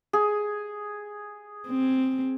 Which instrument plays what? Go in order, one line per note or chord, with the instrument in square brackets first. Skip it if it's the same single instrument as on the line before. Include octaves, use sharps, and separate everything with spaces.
[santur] G#4
[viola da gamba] C4